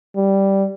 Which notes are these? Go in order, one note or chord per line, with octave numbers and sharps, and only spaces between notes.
G3